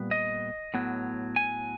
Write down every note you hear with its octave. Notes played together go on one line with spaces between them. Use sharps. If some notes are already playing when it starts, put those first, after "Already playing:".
Already playing: A#2 G3 B3
D#5
A2 F#3 B3
G#5